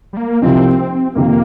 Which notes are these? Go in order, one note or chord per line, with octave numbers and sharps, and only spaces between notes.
G3
A#3
C2 C3 F3 C4 D#4
F2 C3 D#3 A#3